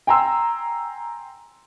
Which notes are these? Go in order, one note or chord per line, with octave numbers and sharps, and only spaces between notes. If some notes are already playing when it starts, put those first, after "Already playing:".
G5 G#5 A#5 C6 E6